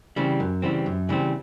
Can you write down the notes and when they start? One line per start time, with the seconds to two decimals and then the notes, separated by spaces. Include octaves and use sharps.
0.16 C#3 E3 G3 C4
0.40 F#2
0.62 C#3 E3 G3 C4
0.86 F#2
1.09 C#3 E3 G3 C4